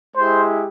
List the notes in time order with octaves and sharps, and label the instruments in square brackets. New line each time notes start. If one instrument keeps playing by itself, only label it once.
[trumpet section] G#3 E4 G4 C5